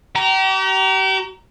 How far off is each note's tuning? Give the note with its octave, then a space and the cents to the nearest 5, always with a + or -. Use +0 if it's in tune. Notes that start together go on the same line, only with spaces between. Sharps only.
G4 -40 A#5 +0